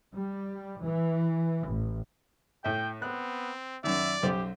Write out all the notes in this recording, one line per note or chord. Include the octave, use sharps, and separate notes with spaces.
G3
E3
A1
A2 E5 G5
B3 C4 F#6
F#2 D#3 D5 E5
B1 F#2 G4 C5